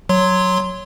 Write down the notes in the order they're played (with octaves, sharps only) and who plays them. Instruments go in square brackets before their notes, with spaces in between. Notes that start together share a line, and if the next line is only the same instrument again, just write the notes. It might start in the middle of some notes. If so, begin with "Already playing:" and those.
[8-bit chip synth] F#3 C#5 C6